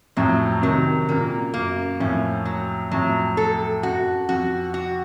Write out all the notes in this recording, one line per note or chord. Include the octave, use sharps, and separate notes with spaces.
F2 A2 F#3
C3 D#3 F#3
A#2 C#3 A#3
F#2 A#3
F2 A2 C#4
F#3
F2 A2 F#3
A4
F#2 F#4
F2 F#4
F#4